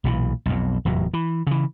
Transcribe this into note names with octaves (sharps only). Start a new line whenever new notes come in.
B1 A#2 E3
B1 F2
F1 E2 A2 F#3
E3
C#3 E3